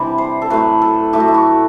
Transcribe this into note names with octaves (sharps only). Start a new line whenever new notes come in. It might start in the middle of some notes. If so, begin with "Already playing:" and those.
Already playing: C3 E3 G3 D4
C5
A4
A2 F#3 A3 B4
A4
A2 F#3 A3 G4
F#4
E4
F#4